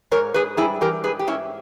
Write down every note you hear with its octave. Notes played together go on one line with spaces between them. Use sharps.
G#2 A#4 C#5
G#2 G#4 B4
G3 E4 G#4
E3 G4 A#4
G#2 G#4 B4
G4
G#2 C#4 E4